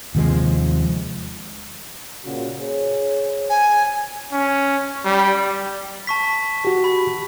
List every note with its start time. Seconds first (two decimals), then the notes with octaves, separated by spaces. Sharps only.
0.15 D#2 C3 F3 G#3
2.24 A#2 C#3 F#4
2.59 G#4 C5 C#5
3.49 G#5
4.32 C#4
5.05 G3
6.07 A5 C#6 B6
6.65 F#4 G4
6.84 B5